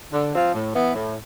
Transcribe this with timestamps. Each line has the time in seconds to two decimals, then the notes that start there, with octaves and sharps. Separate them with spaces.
0.12 D3
0.33 F3 C4 F4
0.54 A2
0.74 E3 B3
0.95 A2